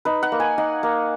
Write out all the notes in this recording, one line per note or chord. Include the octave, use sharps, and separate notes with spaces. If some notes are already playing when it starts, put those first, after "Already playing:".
D#4 B4
F#5
A#3
G#5
D#4 F#5
A#3